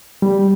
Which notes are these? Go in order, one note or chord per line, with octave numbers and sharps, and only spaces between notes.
G3